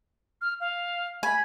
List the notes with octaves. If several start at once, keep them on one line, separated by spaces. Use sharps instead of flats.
F6
F5
G#5 B5